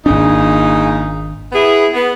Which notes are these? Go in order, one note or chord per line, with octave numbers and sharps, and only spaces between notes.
G#1 A#2 C#3 D4 D#4
B3 E4 G#4
B3